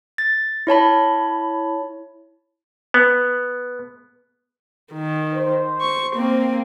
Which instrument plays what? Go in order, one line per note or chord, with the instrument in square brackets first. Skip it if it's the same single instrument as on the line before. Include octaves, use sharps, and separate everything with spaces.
[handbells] A6
E4 C#5 A5 B5
[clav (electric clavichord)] B3
[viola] D#3
[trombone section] C5
[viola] C#6
A#3 C4